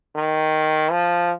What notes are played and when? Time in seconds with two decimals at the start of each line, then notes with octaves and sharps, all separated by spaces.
0.15 D#3
0.91 F3